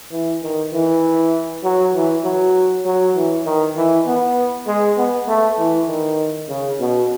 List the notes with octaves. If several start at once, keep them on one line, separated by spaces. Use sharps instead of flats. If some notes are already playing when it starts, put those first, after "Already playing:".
E3
D#3
E3
F#3
E3
F#3
F#3
E3
D#3
E3
B3
G#3
B3
A3
E3
D#3
C#3
B2